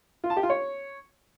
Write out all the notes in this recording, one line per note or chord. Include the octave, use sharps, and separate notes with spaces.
F4
A5
G4
F4
C#5